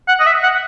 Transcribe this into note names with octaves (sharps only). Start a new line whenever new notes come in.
F#5
D#5
E5
F#5